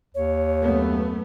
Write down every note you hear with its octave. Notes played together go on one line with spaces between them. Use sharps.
D#2 C#5
F#2 A3 B3